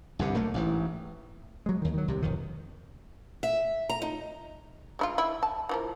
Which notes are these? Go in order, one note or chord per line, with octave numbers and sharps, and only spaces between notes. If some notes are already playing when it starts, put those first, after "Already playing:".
C2 G2 D3
B1 A3 A#3
A1 G#2 E3
F#3 G#3
D#2 D#3
D#3 F#3
C2 C3
E1 F2 D#3
E5
A#5
D#4
G#3 E4 F4
E4
A5
E3 F3 A#4